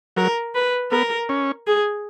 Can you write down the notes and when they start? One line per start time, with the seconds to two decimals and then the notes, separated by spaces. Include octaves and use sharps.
0.17 F#3 A#4
0.55 B4
0.92 B3 A#4
1.29 C#4
1.67 G#4